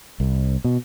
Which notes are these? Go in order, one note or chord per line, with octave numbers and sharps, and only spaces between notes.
C2
B2